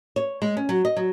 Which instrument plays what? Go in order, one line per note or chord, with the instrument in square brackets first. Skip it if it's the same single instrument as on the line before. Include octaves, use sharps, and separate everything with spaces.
[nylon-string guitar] C#5
G#3
C#4
F#3
D#5
F#3